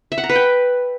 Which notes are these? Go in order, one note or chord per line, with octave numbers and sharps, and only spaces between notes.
E5
F#5
A#5
B4
G5